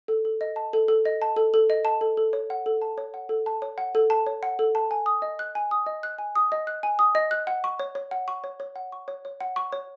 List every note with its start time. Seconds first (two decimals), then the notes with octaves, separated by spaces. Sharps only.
0.08 A4
0.25 A4
0.41 D#5
0.56 A5
0.73 A4
0.88 A4
1.05 D#5
1.22 A5
1.36 A4
1.54 A4
1.70 D#5
1.85 A5
2.01 A4
2.17 A4
2.33 C#5
2.50 F#5
2.66 A4
2.82 A5
2.98 C#5
3.14 F#5
3.29 A4
3.46 A5
3.62 C#5
3.78 F#5
3.95 A4
4.10 A5
4.26 C#5
4.43 F#5
4.59 A4
4.75 A5
4.91 G#5
5.06 D#6
5.22 D#5
5.39 F#6
5.55 G#5
5.71 D#6
5.86 D#5
6.03 F#6
6.18 G#5
6.35 D#6
6.52 D#5
6.67 F#6
6.83 G#5
6.99 D#6
7.15 D#5
7.31 F#6
7.47 F#5
7.64 C#6
7.79 C#5
7.95 C#5
8.11 F#5
8.28 C#6
8.44 C#5
8.60 C#5
8.76 F#5
8.92 C#6
9.08 C#5
9.25 C#5
9.41 F#5
9.56 C#6
9.72 C#5